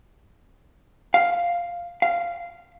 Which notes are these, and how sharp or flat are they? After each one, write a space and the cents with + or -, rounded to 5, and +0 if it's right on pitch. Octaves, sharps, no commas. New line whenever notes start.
F5 +0
F5 -15